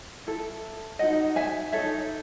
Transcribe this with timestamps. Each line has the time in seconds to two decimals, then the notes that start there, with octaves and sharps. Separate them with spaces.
0.27 E4 A4
0.99 D#4 F#4 A4 D#5 F#5
1.36 E5 G#5
1.72 D#4 F#4 A4 C#5 E5